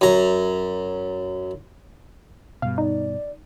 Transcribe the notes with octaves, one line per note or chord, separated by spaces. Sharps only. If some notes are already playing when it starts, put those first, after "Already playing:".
F#2 A#5
G2 B2 F5
D#4 D5